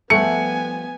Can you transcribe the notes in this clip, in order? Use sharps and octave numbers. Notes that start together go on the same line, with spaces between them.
F3 G3 A3 B3 F#5 G#5 C#7